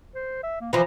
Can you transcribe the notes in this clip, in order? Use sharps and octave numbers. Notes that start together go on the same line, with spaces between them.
C5
E5
A#3
E3 F3 A#5